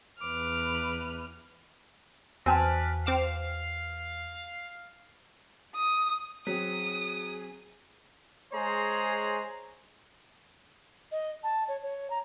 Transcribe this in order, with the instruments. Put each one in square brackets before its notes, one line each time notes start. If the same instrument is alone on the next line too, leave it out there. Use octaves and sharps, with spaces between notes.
[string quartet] E2 B4 F6 [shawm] D6
[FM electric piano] E2 F6 [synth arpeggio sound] C4 [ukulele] F#4 G#5 A5 [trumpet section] B4 D5
[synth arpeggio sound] C4 D6 E7 [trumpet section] F5
[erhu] D#6
[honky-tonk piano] F#3 [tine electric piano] C4 B6 [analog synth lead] G#4 [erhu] D#6
[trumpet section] G#3 G#4 C5 C#5 A#5
[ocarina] D#5
A5
C#5
C#5
A#5